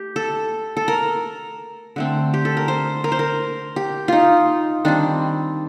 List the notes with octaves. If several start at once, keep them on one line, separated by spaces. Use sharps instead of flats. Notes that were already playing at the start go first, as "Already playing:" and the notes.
Already playing: A3 G4
A4
A4
A#4
D3 A3 C4
G4
A4
A#4
C5
A#4
C5
A#4
G4
D#4 F4
D#3 G3 C4 D4